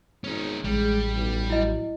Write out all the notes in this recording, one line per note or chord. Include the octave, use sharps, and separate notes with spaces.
G#1 C#4 D#4
A1 G3 G#3
B1
F#3 E4 D#5